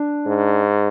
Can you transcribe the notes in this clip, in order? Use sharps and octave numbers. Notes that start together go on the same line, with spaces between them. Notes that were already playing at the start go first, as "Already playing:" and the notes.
Already playing: D4
G#2